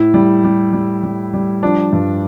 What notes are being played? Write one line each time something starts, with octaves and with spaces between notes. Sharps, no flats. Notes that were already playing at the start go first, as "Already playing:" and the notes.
Already playing: A2 E4
G3
G3
G3
G3
G3
F3 D4
G2